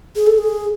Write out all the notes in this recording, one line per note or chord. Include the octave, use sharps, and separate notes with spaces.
G#4
A4
G#4